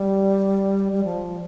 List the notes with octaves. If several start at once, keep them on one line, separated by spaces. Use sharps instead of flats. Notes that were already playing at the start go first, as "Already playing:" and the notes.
Already playing: G3
G3
F3